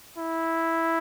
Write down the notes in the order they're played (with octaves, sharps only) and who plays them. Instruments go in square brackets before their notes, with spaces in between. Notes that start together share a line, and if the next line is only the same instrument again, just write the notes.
[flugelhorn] E4